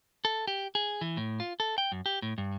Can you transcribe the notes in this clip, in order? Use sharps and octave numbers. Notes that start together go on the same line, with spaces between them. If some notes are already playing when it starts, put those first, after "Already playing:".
A4
G4
G#4
E3
A2
F4
A4
G5
F#2
G4
A2
G2